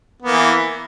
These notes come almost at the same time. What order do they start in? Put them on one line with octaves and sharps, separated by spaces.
B3 A#3 E3